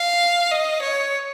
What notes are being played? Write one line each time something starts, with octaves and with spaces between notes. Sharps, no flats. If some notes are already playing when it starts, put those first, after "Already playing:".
Already playing: F5
D#5
C#5